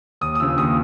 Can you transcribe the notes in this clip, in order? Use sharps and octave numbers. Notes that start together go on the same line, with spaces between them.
D#2 D#6
D#6
C#3 F3 E6
D#2 D#6